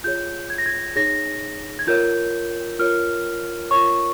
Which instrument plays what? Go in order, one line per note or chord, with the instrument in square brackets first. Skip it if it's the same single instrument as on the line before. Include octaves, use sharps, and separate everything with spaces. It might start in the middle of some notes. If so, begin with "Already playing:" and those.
[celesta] F4 G#4 C#5 G6
G#6
A#6
G#6
D#4 G#4 C#5 A#6
G#6
F4 A#4 C#5 G6
F4 A#4 C#5 F6
F4 A#4 C#5 C#6